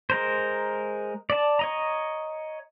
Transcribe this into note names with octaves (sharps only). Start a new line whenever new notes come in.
G#3 A#4 C5
D5 A5
C#5 D#5 A#5